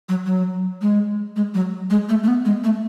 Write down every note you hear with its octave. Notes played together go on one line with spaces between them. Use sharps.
F#3
F#3
G#3
G#3
F#3
G#3
A3
A3
B3
G#3
A3